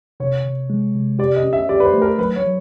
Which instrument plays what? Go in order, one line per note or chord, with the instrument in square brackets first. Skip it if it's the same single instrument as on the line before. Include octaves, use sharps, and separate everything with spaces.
[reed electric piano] C3 [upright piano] C#5
[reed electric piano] C3
G#3
C3
[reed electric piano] G4 [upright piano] D5
[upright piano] D#5
[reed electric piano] C#4
[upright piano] E5
[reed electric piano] G4 [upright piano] D5
[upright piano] B4
C5
[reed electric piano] A3
[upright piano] A#4
[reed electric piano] F#3 [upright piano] B4
[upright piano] C#5
[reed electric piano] F#3